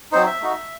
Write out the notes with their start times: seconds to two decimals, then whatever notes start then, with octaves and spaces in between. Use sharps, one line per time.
0.12 F#3 C4 D#4 C5
0.26 E5
0.40 A3 D#4 F#4